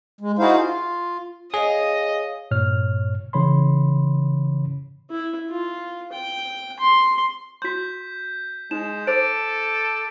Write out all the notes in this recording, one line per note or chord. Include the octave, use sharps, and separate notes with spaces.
G#3
D#4 E4 F#4 G#4 C5 F5
F4
G#4 C#5 D#5 F5
G2 A#2 C#5 F6
C#3 E3 C#5 B5 C6
E4
F4
G5
C6
F#4 C6 G6 B6
G#3 D#4 E7
A4 C5 D6 A6 D7